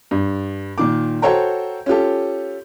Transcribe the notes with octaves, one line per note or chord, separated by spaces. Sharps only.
G2
A#2 D#3 D6
F#4 A4 C5 C#5 G5 A#5
C#4 F4 G4 A4